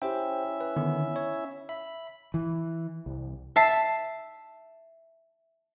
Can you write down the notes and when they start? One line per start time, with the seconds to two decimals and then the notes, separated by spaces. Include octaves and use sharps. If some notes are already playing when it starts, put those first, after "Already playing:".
0.02 C#4 E4 G4 C5 E5 G5
0.61 B4
0.76 D3 D#3 B3
1.16 C#5
1.69 E5 B5
2.34 E3
3.06 C2
3.56 E5 A5 C7